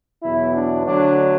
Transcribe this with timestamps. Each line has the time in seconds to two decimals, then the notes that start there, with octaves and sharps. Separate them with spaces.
0.23 E2 B2 F#3 E4
0.55 D4
0.86 D2 D3 F#3 D4